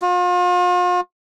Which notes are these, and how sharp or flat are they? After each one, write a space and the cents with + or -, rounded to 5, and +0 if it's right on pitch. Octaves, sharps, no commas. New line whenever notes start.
F4 +40